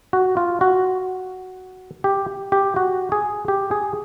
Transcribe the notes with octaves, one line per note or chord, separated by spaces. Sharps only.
F#4
F4
F#4
G4
G4
F#4
G#4
G4
G#4